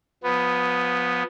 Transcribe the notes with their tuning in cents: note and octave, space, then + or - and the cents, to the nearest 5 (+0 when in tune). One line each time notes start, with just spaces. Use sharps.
F3 +25 B3 +0